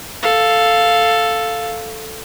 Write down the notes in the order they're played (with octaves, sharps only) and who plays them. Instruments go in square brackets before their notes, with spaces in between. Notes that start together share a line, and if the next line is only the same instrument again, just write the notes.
[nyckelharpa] A4 F5